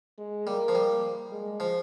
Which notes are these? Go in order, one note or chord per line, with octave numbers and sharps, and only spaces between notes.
G#3
G3 A#3
F3
G3
G#3
F3